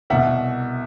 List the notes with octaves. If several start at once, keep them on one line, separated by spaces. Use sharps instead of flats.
C2 B2 E5 F#5